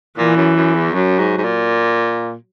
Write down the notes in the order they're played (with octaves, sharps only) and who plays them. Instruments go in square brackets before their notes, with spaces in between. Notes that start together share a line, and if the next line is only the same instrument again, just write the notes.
[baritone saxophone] A#2 [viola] E3
[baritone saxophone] F#2
F#2
E2
[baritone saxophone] F#2 [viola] F#3
[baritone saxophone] G#2
G#2
A#2